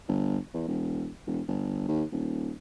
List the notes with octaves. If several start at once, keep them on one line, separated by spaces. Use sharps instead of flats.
G1
E2
E1
E1
G1
D#2
D#1